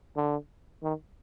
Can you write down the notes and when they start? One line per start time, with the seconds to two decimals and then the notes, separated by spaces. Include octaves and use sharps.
0.16 D3
0.83 D#3